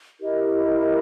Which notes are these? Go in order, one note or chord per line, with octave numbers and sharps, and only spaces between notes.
E4 G4 A#4 D#5